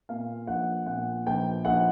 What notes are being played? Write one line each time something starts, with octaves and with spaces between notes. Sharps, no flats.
A#2 F5
A#1 F#5
A#2 F#5
A#1 G5
A#1 F#5